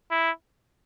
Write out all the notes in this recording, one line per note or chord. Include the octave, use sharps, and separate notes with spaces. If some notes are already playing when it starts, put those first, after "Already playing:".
E4